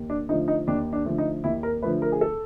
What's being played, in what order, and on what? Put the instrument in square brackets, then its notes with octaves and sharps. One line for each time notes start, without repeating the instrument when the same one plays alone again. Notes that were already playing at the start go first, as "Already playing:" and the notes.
Already playing: [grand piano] D#2
D4
D3 F3 A3 D#4
D#4
D#2 D4
D4
D3 F3 A3
D#4
D#2 E4
A#4
D3 F3 A3 B4
A#4
G#4
A4